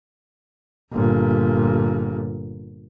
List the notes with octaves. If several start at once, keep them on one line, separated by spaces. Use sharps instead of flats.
G1 A#2